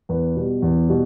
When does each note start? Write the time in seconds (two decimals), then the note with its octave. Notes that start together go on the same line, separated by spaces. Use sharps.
0.09 E2 B4
0.36 B2 G3
0.62 E2
0.88 B2 G3